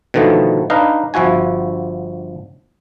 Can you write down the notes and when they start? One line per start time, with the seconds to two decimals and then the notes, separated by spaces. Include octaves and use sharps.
0.14 B2 D3 D#3 F3 A3 B3
0.70 D4 D#4 B4 D#5 F5
1.14 G1 F3 E4 F#4 G#5